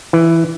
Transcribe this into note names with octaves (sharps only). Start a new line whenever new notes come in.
E3